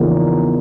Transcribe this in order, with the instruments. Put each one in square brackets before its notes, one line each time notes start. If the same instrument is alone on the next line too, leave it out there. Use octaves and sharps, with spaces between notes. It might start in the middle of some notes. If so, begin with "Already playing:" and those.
Already playing: [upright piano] E2 C#3 F3 A#3 D#4